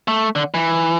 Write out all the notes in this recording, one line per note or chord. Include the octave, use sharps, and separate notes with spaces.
A3
D3
E3